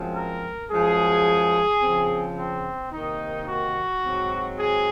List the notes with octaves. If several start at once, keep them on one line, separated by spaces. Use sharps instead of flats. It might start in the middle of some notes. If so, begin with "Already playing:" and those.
Already playing: F#2 F3 G#3 C4
A#4
F#2 F3 G#3 G#4
C#3 F3 C4
C4
C3 D#3 A#3 D#4
F#4
G#2 F#3 C4
G#4